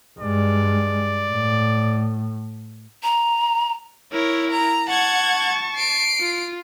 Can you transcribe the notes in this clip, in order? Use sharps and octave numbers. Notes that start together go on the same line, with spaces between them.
G2 G#3 D5
A2
A#5
E4 A#4 C#5
A#5
F#5 A5 C#6 G#6
C7 D7
F4